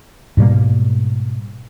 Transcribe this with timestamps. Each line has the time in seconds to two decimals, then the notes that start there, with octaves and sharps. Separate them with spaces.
0.37 G#2 B2 G3 A#3